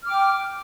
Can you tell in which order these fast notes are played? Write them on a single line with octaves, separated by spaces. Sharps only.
F6 D6 G5